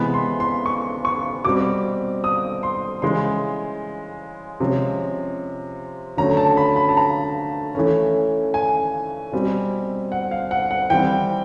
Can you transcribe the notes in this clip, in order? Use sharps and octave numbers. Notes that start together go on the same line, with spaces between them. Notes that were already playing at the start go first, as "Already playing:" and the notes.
Already playing: C3 E3 G#3 B3 B5
C6
C6
C#6
C#6
B2 G3 C4 D6
D#6
C6
C#3 E3 G#3 C6
C3 F3 G#3 C#4
D3 F#3 A3 C#4 A#5
A5
B5
B5
A5
A#5
E3 A3 C#4
G#5
B2 G3 C4
F#5
F5
F#5
F#5
E3 G3 C4 G5